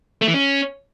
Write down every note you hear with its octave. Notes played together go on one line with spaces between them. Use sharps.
A3
E3
C#4